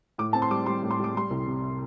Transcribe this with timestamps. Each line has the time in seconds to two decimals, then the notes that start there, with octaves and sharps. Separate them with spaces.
0.18 A2 D6
0.33 C4 A5
0.42 C6
0.51 G3 D6
0.66 G3 C6
0.83 A2
0.91 C6
1.00 G3 D6
1.16 G3 C6
1.30 C2
1.46 C3